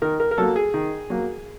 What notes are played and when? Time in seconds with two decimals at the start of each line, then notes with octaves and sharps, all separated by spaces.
0.02 D#3 A#4
0.20 A#4
0.31 A#4
0.38 F#3 A#3 A4
0.56 G#4
0.74 D#3
1.10 F#3 A#3